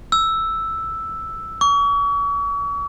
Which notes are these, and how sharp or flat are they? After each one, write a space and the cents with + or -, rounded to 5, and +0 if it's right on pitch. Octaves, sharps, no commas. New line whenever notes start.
E6 +0
C#6 +40